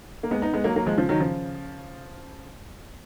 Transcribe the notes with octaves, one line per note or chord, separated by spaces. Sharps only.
A#3
G#3 B3
B3 D#4
G#3 B3
F#3 A#3
F#3 A#3
F3 G#3
C#3 F3
D#3 F#3
C#3 F3